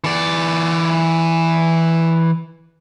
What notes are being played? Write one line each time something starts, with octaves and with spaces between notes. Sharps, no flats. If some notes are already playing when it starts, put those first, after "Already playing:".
E3 D5